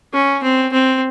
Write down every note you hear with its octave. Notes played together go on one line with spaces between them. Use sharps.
C#4
C4
C4